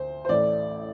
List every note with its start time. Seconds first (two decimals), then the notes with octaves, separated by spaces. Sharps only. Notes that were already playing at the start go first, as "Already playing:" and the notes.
Already playing: D2 C5
0.25 C5
0.29 A1 A2 A3 D5